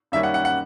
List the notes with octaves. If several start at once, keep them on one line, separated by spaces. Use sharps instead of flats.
F#2 D#3 G3 A#3 C#4 E5
F#5
F#5
F#5